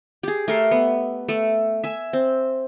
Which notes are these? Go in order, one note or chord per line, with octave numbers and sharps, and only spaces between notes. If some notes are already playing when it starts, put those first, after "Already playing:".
G4 G#4
A3 A#4 C6
B3
A3
E5 G#5
C4